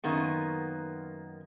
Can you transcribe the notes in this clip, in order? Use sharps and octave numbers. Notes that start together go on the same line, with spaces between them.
F#2 D#3 A#3 B3